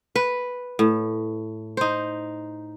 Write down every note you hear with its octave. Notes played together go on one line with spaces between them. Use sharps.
B4
A2
D#4 C5